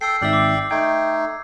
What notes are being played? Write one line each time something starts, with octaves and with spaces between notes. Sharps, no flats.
A4 G5 E6 C7
G#1 G#2 D5 E5 G5 E6 F6
D6 C7
A3 D#4 G5 G#6